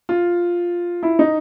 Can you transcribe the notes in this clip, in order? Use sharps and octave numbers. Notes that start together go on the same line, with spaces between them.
F4
E4
D#4